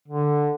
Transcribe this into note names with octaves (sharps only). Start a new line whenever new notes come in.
D3